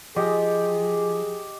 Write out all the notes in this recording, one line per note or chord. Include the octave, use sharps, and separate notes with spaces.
F3 G4 G#4 D#5